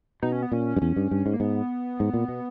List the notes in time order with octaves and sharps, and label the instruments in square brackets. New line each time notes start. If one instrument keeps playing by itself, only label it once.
[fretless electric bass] B2 [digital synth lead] D#4
[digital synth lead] C#4
B3
[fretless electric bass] A#2 [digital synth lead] C#4
[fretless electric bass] G2
[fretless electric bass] E2 [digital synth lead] C#4
[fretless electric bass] G2
G2
G#2
[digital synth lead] A#3
[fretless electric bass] G#2 [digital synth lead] B3
[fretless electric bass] G#2
A#2
B2